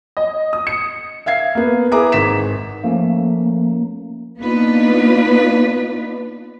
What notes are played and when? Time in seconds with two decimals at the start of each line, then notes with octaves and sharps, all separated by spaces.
0.17 D#5
0.53 D#6
0.67 C#7
1.26 E5 F5 G#6 C7
1.55 A#3 B3
1.91 E4 G#4 B4 E5 A#5 D6
2.12 G#1 B6 E7
2.84 F3 A3 A#3 C#4
4.39 A#3 B3 D4 D#4 F4 B4